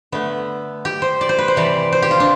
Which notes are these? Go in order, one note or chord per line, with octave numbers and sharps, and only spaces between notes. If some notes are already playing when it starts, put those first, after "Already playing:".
D3 A3 B3
G4
C5
D5
C5
B4
C5
C3 E3 G3 D5
C5
G4
F4
D4